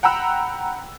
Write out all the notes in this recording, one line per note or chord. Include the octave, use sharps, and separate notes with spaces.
F#5 G5 A#5 B5 E6 F#6